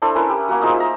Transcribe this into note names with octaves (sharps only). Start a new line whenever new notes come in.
D4 E4 A4 C5
C#4 E4 A#4 B4
G4
A#3 F#4
D#4 F4 G#4 C5
E5 A#5